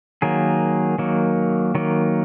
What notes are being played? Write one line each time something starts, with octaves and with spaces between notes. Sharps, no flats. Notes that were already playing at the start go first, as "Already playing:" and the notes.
D#3 F#3 A#3 G#4
D#3 F#3 A#3
D#3 F#3 A#3